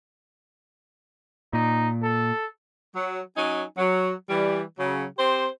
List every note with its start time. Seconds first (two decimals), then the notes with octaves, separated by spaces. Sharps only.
1.53 A#2 D#4
2.03 A4
2.95 F#3
3.37 F#3 C#4 D#4 G#5
3.78 F#3
4.30 E3 G3
4.78 C#3 F#3
5.19 C4 G4 C5